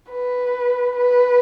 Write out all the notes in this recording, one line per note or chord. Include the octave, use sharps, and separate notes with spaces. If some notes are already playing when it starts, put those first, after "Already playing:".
B4
B4